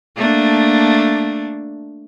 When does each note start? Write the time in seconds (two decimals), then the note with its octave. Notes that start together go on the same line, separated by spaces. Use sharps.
0.16 A3 A#3 D4